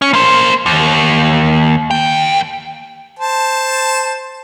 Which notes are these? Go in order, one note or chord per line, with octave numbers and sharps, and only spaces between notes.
C#4
A#3 C5
D#2
D#2 G5
C5 A5